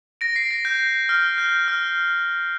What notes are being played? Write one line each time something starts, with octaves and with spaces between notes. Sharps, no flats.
A#6 D7
C7
A#6
G6
F6
G6
F6